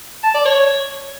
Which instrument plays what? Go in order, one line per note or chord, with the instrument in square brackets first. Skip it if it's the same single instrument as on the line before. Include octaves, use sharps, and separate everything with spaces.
[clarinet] A5
D5
C#5